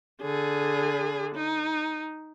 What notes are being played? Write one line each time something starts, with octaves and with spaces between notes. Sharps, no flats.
D3 G#4
D#4